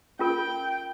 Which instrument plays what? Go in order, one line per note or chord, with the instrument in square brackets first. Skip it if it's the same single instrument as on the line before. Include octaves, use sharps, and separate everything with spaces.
[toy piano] C#4 F4 A#4 [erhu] G5